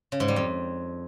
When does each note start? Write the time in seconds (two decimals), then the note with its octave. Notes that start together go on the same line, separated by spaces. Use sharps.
0.12 C#3
0.20 G#2
0.28 G3
0.36 F2